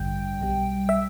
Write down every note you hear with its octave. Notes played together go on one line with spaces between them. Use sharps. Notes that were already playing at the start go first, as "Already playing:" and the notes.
Already playing: A1 G2 D3 G3 G5
B1 B2 G3
E5